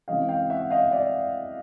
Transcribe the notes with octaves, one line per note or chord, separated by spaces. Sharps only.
C#3 E3 G#3 C4 D#5 F5
F5 G5
E5 F#5
D#5 F5
D5 E5